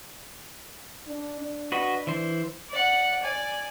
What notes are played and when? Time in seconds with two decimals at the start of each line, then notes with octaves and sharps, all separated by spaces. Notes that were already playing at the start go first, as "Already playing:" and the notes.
1.07 D4
1.40 D4
1.72 F#4 B4 D#5
2.07 E3 C5
2.70 D5 F#5
3.22 D5 G#5